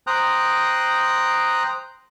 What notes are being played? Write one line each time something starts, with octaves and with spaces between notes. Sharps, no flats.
C5 G5 A#5 D#6 F#6